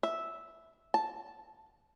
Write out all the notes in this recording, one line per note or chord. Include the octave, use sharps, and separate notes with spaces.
E5
A5